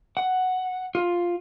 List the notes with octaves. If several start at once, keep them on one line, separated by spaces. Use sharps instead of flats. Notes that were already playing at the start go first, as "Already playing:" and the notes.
F#5
F4